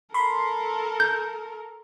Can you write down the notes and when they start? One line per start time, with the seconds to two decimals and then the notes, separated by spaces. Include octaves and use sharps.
0.14 A4 A#4 B5 C6
1.00 G6